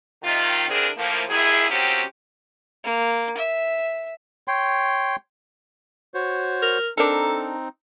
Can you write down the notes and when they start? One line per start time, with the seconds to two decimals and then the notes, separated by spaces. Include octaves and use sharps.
0.23 C3 D#3 F4
0.68 D3 E3 C4 D4 G#4 A#4
0.97 A2 F3 A#3
1.29 F#2 C3 D#3 E4 G#4
1.70 D#2 F3 F#3 C4 C#4 G4
2.84 A#3
3.38 E5
4.48 C#5 G5 C6
6.14 F#4 C5 C#5
6.62 A#4
6.98 C4 D4 D#4 A4 A#4